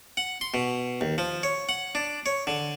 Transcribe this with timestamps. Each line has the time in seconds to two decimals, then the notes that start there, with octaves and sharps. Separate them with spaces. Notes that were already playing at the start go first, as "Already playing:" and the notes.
0.17 F#5
0.41 C6
0.54 B2
1.01 D#2
1.18 F3
1.43 C#5
1.69 F#5
1.95 D4
2.26 C#5
2.47 D3